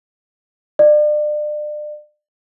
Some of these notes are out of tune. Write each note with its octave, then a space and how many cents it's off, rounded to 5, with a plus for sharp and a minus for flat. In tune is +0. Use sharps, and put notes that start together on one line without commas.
D5 +35